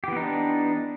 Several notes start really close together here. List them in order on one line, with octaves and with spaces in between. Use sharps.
G4 E3 B3 D#4 D4